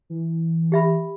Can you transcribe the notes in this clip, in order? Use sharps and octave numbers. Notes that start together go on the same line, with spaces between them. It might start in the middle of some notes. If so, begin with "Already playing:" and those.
E3
G4 E5 B5